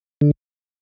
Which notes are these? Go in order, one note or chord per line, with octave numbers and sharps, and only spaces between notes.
D3